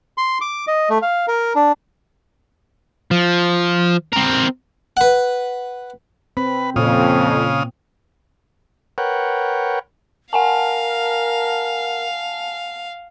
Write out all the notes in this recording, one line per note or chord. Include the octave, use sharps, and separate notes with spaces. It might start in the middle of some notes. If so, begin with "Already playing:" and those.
C6
D6
D#5
A3
F5
A#4
D4
F3
C4 A#4
B4 F#5
C4 B4
F2 A#2 C#3 F5 D#6
A#4 B4 C#5 F#5 G5
A#4 F5 F#5 G#5 A5